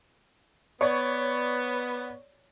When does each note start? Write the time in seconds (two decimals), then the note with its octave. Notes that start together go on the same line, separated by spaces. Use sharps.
0.81 B3 C#5 D5 C#6